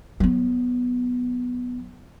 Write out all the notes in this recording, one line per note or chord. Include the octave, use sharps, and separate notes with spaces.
F#3 B3